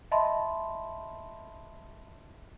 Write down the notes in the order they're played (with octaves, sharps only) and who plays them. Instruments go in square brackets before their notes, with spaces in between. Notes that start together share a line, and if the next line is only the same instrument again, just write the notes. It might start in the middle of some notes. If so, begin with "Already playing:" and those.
[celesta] D#5 E5 A5 B5 C6